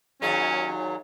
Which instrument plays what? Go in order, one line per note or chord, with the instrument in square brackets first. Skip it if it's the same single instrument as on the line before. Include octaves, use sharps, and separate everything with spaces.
[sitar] D#2 A#2 G#4 [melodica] F#3 [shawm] C#4